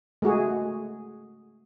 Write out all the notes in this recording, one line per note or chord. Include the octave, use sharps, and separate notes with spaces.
G#3 A3 F#4 G#4